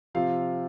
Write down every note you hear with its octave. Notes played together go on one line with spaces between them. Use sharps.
C3 F3 C4 F4 F5